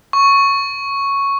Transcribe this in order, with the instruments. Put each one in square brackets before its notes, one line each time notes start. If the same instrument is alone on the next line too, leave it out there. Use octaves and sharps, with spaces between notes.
[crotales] C#6